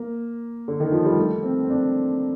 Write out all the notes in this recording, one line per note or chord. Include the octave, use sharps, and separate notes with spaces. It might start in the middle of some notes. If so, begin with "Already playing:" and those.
Already playing: A#3
D3
D#3
F3
G3
A3
C4
C4
D4